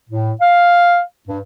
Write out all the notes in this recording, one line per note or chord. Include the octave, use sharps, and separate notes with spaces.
A2
F5
G2